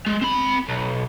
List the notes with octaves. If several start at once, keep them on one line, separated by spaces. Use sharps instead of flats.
G#3
C4 B5
B1